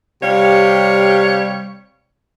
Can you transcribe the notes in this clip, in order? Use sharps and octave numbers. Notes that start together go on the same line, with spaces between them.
C3 G3 C#5 F5